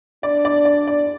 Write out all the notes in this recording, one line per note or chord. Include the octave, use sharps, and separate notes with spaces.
D4 D5
D5
D5
D5